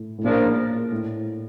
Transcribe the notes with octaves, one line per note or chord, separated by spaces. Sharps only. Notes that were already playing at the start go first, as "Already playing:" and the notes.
Already playing: A2
A2
A#2 C#3 F3 A#3 D4
A2